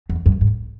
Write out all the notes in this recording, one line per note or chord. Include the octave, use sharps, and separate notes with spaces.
E2
F#2
G#2